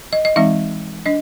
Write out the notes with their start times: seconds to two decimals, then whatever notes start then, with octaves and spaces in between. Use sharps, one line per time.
0.13 D#5
0.25 D#5
0.36 E3 G#3 C4 D#4 E5
1.06 D4 D#5